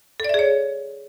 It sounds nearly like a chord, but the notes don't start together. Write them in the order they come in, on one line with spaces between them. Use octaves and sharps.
A4 D5 E5 G#4 C#5